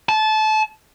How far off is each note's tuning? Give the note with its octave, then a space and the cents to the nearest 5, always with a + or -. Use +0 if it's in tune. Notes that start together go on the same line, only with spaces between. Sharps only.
A5 -25